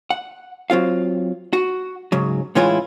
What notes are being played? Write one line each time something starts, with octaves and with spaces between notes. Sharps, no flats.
F#5
F#3 C4 F4 F5
F#4
G#2 C#3 F#3
A2 E3 G#3 C#4 E4 F4